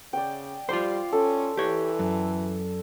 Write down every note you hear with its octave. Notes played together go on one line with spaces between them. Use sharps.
C#3 D5 G5
G3 F4 C5 D5 C6
C#4 A4
E3 G4 C#5
F#2